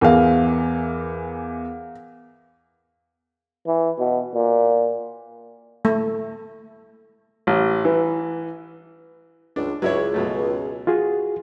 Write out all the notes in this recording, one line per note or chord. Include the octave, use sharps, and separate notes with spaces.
E2 E3 A#4 F5
E3
B2
A#2
A3
A1
E3
C#2 D4
C#2 F#3 E4 C#5
B2 F#3 A3
F4 F#4 G#4